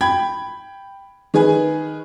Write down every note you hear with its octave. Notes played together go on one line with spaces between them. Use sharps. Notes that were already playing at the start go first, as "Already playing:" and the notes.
G5 B5 G#6
D#3 G#4 B4 G#5